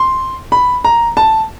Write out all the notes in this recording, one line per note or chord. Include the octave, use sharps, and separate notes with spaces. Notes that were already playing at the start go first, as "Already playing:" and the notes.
Already playing: C6
B5
A#5
A5